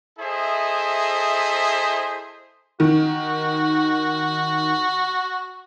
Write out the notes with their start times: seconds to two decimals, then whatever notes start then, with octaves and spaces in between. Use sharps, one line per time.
0.19 E4 G#4 A4 C5 D#5 E5
2.80 D#3 F#4